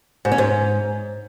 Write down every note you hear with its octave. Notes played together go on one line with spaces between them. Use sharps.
G#2
C#4
G#2